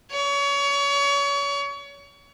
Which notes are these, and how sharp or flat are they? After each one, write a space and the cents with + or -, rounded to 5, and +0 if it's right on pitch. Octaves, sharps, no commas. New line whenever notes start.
C#5 +30